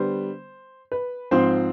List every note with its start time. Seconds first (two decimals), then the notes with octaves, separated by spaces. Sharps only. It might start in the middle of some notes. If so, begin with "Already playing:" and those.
Already playing: D3 G3 B3 C5
0.92 B4
1.31 G#2 F3 C4 C5